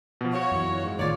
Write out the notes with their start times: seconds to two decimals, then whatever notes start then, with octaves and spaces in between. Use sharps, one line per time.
0.21 B2 F3
0.33 F#4 C#5 F5
0.52 F#2 E3
0.84 G#2
0.99 G#1 A2 D#3 F4 C#5 D5